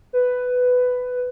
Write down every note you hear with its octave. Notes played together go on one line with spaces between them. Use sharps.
B4